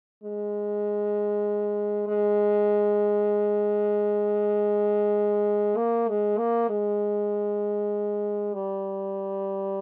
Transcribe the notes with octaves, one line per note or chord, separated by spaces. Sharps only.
G#3
G#3
A#3
G#3
A#3
G#3
G3